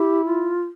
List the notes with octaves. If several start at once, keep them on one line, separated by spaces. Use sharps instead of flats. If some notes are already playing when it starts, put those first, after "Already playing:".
Already playing: E4 G4
F4